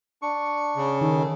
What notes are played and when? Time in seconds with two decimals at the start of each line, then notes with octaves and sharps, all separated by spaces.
0.22 D4 C#6
0.76 C#3
1.01 D#3 A4